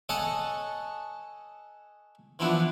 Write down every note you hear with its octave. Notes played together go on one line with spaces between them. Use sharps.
A4 C#5 D#5 F#5 G#5 A5
E3 F3 B3 D4 E4